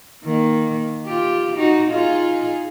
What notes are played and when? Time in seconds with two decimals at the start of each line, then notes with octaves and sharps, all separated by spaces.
0.25 D#3 A#3
1.06 F4 G4
1.56 D#4 F#4
1.90 D#4 F4 G#4